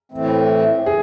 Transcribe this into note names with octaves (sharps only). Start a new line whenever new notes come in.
A2 E3 A3 C4
G#4